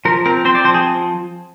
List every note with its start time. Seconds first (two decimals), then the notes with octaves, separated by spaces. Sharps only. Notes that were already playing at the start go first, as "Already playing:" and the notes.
0.05 F3 A#4
0.26 C4 A#4
0.45 C4 C5
0.55 D5
0.64 F3 C5
0.74 G#4